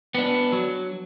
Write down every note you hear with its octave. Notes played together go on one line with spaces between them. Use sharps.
B3 D4
F#3